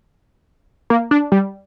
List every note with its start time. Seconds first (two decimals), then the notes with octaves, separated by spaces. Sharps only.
0.90 A#3
1.11 D4
1.32 G3